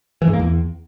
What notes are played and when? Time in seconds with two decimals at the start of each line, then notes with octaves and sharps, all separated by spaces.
0.22 E3
0.28 G#2
0.33 A#3
0.39 E2